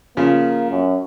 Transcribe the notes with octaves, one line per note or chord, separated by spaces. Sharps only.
C#3 F3 A#3
F#2